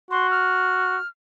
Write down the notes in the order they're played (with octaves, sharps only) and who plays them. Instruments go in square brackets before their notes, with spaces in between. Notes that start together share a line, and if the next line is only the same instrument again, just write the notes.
[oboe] F#4 [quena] C6
[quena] F6